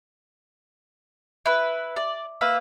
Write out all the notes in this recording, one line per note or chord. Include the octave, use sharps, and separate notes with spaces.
E4 B4
D5
A#3 B4 E5